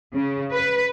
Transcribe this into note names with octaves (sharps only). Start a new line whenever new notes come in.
C#3
B4